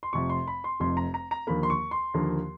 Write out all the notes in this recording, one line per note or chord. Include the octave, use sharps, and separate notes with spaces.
C6
F1 F2 C3 C#6
C6
B5
C6
F1 F2 C3 C6
A#5
A#5
A#5
D#2 D3 F3 A#3 B5
C6
C#6
C6
D#2 D3 F3 A#3